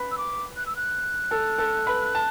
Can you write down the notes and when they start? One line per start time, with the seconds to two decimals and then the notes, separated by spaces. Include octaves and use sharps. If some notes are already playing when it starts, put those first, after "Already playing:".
Already playing: B4 B5
0.11 E6
0.18 D6
0.56 F#6
0.66 E6
0.76 F#6
1.31 A4 A5
1.59 A4 A5
1.87 B4 B5
2.15 A5